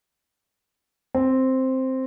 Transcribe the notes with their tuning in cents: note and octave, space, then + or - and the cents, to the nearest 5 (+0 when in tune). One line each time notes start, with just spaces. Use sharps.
C4 +0